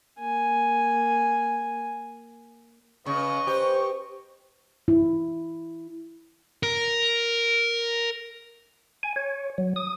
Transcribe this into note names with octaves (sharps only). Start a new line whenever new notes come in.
A#3 G#5
C#3 B4 D#5 C#6
G4 C5
E4
A#4
G#5
C#5
F#3
D#6